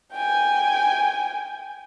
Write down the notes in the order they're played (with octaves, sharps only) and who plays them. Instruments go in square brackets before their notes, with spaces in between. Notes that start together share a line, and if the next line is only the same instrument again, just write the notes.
[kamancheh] G5 G#5